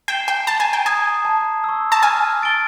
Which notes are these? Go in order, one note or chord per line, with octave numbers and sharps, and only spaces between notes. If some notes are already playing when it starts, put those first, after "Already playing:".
G5 C7 E7 G7
G5
A5 A#5
G#5
G5
G#5 D#6 G#6
A5
C#6 E6
A5
G#5 F6
A6 D7 G7